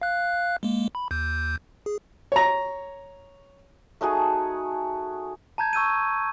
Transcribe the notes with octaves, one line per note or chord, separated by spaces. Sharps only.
F5 F#6
G#3 A#3
B5
D#2 G6
G#4
C#5 A#5
A3 D#4 F#4 G#4
A5 A#5 G6 G#6
C#6 E6 G6 D#7